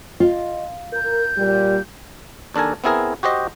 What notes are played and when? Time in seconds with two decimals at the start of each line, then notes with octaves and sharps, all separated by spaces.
0.20 F4 D#5
0.93 A#4 G6
1.37 A#2 G3
2.54 D#2 D4 A4 A#4 G#5
2.84 B3 C4 E4 G#4 A#4
3.23 F#4 G4 C5 D#5